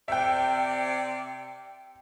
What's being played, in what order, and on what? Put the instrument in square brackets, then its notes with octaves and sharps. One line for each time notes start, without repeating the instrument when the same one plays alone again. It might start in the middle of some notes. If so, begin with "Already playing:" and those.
[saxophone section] C3 D5 [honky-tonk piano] E5 G5